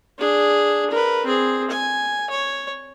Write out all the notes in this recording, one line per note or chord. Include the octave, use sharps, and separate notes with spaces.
D4 G#4
A#4 B4
C4 G#4
G#5
C#5